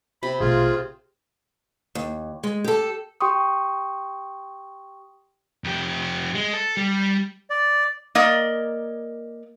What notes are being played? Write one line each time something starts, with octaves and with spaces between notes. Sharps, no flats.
C3 B5
A#1 B2 A3 F4 G#4
D#2
G#3
G4 A4
G4 G5 C6 C#6 D#6
F2 G4
G#3
A4
G3
D5
A#3 A#4 D5 D#5